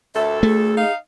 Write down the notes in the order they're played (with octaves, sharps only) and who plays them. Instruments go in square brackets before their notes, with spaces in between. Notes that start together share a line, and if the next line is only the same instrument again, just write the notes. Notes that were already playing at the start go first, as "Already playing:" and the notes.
[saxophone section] D2 A#2 A4 [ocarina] E5
[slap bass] A3 [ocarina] G#4
[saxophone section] D#4 F5